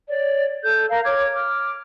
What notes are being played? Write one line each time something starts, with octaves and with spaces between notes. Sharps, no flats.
C#5 D5
A4 G6
A#4 F5
C#5 D6 F6 G#6
D6 F6